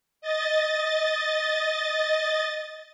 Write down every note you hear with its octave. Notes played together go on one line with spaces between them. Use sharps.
D#5 A6